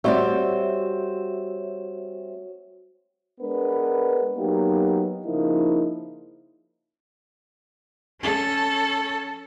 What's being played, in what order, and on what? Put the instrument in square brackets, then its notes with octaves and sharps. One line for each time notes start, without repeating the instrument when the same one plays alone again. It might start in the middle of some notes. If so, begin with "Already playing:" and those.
[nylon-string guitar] G3 C4 D5 [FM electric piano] F#4 C#5 E5
[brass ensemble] G#3 B3 D4 A#4 B4
F#3 A#3 B3 D#4 F#4 G4
C#3 F3 A#3 D#4 E4
[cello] C#4 A4